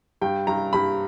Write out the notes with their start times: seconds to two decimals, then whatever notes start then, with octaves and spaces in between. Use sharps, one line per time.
0.22 G2 G5
0.47 G2 A#5
0.73 G2 B5